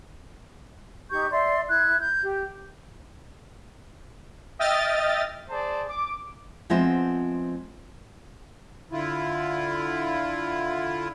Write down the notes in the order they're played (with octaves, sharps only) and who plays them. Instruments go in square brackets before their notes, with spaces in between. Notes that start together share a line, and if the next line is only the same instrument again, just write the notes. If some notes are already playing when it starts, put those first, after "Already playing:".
[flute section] D#4 G4 C#6 G6
D5 E5 C6
E4 F#6 G#6
G6
G4
[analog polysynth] D#5 E5 G5 D#6 F6 A6
[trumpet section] G#4 C5 D5 A5
D6
[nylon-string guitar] F3 G#3 B3 C4 F4 E5
[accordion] D3 E4 F4